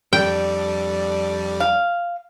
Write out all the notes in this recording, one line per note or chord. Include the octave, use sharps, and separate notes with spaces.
F2 G3 D4 A4 D5 G5
F5